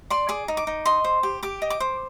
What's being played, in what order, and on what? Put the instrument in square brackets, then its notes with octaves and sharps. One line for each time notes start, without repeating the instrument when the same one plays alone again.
[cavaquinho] D5 C6
G#4 D6
D#4
D6
D#4
D#5 C6
C5
G4
G4 D6
D#5
D6
C5